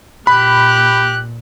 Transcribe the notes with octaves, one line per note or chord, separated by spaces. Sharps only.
A#2 G4 B5 F#6